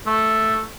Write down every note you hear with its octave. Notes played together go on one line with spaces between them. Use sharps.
A3